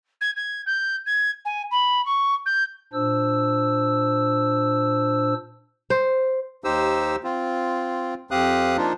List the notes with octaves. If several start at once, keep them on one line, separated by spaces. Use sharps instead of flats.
G#6
G#6
G6
G#6
G#5
B5
C#6
G6
A#2 D4 C5 E6
C5
D#2 D#4 G4 C5 E6
C4 F4
F2 C4 G4 F5 D#6 F#6
F3 A#3 D4 D#4 F4